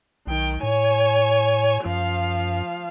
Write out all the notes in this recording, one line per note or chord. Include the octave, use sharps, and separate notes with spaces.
B1 D#3 G5
A2 C#5 G#5
F#2 F3 F5